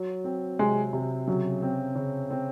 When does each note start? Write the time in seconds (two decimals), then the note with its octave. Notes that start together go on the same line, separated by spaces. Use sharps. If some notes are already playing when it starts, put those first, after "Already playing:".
Already playing: F#3
0.24 C4
0.59 C3 G#3
0.93 C3
1.28 C#3 F#3
1.62 C4
1.95 C#3
2.31 C4